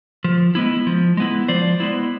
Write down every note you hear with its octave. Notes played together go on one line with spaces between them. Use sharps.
F3
G#3 B3 E4
F3
G#3 B3 E4
F3 C5 D5
G#3 B3 E4